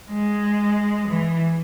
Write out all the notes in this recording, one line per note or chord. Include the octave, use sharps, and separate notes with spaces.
G#3
E3